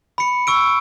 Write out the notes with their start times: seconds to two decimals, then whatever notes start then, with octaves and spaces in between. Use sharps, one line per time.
0.18 B5 C#7
0.47 C#6 E6 D7